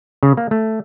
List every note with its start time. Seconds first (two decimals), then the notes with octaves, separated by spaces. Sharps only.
0.23 C#3
0.37 A#3
0.51 A3